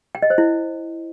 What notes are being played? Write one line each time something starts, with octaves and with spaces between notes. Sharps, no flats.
G5
D#5
C5
E4